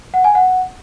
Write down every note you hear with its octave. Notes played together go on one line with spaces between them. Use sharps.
F#5
G#5
F#5